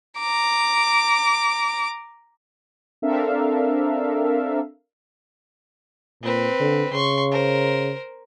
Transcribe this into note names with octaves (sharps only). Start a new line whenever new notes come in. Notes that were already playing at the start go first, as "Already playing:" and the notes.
A#5 D6
C4 D4 A4 A#4 E5 F5
A#2 C4 B4
D3
C#3 C6 C#6
A#4 C5